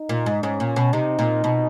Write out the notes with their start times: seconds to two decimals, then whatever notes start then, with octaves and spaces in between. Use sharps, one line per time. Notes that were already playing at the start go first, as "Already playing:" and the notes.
Already playing: D#4
0.09 A#2
0.26 G#2
0.43 G#2 C#4
0.60 A#2
0.76 B2
0.93 C3 D#4
1.19 A#2
1.44 B2